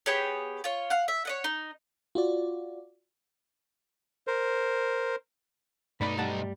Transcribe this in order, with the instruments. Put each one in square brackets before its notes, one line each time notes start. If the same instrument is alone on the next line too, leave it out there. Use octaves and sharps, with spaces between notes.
[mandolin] B3 G4 G#4 C#5
F4 C#5
F5 F#5
E5
C#5 D#5 F#5
D#4
[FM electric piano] F4 F#4 D5
[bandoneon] A#4 C5
[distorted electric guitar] B1 D#4 [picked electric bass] G2 A3 [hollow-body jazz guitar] B4 D5 B5
[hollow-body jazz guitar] G3 F#5 A5